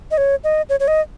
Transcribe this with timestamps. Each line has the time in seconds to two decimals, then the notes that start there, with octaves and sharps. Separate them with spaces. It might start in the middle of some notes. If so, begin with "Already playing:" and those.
0.11 D#5
0.18 C#5
0.44 D#5
0.69 C#5
0.80 C#5
0.88 D#5